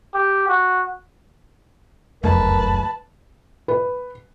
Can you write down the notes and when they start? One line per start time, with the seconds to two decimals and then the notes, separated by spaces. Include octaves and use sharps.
0.14 G4
0.48 F#4
2.24 F1 C#2 F#2 A3 A#4 B4 A5
3.68 B4